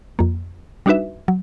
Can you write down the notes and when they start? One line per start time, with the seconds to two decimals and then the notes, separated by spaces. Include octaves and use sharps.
0.19 F2 A#3
0.86 G3 D4 D#4 F#4 B4 E5
1.28 F#3